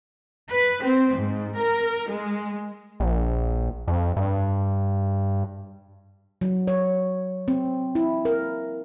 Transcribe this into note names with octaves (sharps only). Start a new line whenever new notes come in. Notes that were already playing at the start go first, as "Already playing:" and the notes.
B4
C4
G#2
A#4
G#3
A#1
F2
G2
F#3
C#5
C4
E4
A#4